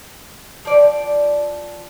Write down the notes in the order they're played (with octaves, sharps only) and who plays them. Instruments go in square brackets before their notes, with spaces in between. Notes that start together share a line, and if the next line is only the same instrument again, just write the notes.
[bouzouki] F3 D5 G5